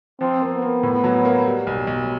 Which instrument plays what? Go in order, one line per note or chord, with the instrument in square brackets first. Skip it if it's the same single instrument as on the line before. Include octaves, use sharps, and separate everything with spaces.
[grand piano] F3 [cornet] C4
[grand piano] A#3
[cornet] B3
[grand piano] A#3
A2
F#3
A#3
G3
B1
B1